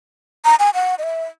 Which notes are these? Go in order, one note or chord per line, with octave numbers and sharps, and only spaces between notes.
A#5
G#5
F#5
D#5
E5